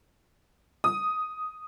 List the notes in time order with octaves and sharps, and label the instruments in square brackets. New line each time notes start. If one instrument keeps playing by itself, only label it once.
[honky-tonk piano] D#6